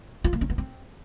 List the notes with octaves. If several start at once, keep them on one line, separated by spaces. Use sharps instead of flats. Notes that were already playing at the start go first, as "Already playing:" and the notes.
F4
A#3
C#4
B3
C4